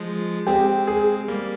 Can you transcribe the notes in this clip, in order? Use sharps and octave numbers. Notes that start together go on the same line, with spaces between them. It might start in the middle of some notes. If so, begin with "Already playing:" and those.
Already playing: F3 G#3
G#3 C4 G4
G#4
G3 A#3